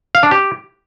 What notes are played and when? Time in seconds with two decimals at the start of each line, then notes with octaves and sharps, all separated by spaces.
0.15 F5
0.23 D4
0.31 G4